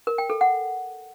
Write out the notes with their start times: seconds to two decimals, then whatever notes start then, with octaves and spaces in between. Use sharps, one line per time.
0.07 A#4
0.18 G5
0.30 A4
0.41 F#5